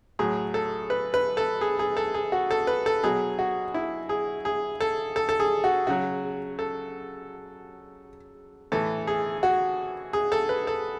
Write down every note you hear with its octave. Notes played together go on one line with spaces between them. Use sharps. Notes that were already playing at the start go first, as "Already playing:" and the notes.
A2 F#3 G#4
A4
B4
B4
A4
G#4
G#4
A4
G#4
F#4
A4
B4
A4
B2 F#3 G#4
F#4
E4
G#4
G#4
A4
A4
A4
G#4
F#4
C#3 F#3 F#4
A4
A2 E3 A4
G#4
F#4
G#4
A4
B4
A4